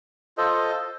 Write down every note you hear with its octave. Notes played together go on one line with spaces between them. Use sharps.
F4 A4 C5 D#5